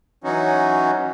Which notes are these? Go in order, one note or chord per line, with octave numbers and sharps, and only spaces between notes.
E3 F#3 C#4 D#4 F#4